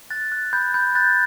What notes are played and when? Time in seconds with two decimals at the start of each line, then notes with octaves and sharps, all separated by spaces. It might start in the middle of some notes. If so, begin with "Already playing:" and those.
0.11 F#6 A6
0.32 F#6
0.53 B5 G6
0.74 B5 G6
0.95 F#6 A6